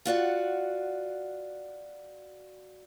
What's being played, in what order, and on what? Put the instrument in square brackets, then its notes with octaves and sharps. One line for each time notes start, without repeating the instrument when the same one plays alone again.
[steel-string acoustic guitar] F4 F#4 D5 F#5